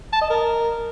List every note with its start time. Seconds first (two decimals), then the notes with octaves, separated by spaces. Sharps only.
0.13 A5
0.22 D#5
0.30 A#4